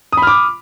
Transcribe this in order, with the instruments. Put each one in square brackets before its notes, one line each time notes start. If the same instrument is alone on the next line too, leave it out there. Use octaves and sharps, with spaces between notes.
[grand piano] D#6
B5
F6
D6